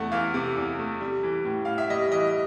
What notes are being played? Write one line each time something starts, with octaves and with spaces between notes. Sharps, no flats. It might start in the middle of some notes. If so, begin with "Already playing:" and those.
Already playing: E2 C3 A3 F#5
E3 F5
C3
E2
A3
G3
E3
A2
A2 F5
E5
G3 D#5
E3 D#5